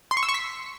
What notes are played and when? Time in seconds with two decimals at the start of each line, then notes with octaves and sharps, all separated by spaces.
0.11 C6
0.17 C#6
0.23 E6
0.29 C#6
0.34 B6